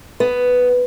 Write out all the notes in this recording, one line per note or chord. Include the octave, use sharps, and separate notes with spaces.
B3